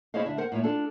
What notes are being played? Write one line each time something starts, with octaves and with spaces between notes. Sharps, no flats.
E4 G#4 C5 C#5 D#5 F5
D2 D3 E5
A#4 C5 F#5
A2 A#3 F4 C#5
D4 F4 A4